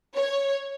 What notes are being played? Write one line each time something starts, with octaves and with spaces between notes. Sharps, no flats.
C#5